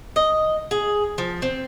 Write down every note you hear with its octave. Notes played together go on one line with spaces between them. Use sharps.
D#5
G#4
F3
C4